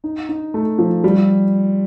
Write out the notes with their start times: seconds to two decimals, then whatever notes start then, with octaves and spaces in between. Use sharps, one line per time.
0.04 D#4
0.29 D#4
0.54 A3
0.79 F3
1.04 G3